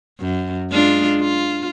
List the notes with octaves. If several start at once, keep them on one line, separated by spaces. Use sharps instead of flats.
F#2
G#3 D4 F4
F4